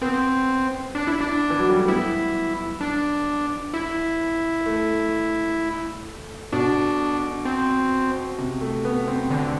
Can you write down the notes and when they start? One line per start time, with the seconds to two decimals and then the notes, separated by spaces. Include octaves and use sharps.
0.02 B3 C4
0.95 D4
1.07 E4
1.21 D4
1.50 E3
1.59 F#3
1.69 G3
1.79 A3
1.88 B3 E4
2.81 D4
3.74 E4
4.66 A3
6.52 B2 D4
7.45 C4
8.38 C3
8.61 A3
8.85 B3
9.08 C4
9.30 D3